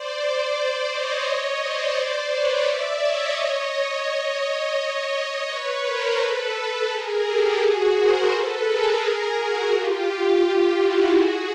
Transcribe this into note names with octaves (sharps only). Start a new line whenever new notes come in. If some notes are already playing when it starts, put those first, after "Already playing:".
Already playing: C5 D5
C#5 D#5
C5 D5
B4 C#5
D5 E5
C#5 D#5
C#5 D#5
C#5 D#5
B4 C#5
A#4 C5
A4 B4
G#4 A#4
G4 A4
F#4 G#4
A#4 C5
A4 B4
G#4 A#4
G#4 A#4
F#4 G#4
F4 G4
F4 G4
E4 F#4
F#4 G#4